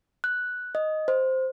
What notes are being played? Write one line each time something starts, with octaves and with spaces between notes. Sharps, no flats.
F#6
D#5
C5